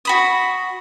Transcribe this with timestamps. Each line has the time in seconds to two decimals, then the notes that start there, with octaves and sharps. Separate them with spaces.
0.05 F#4 B5 D#6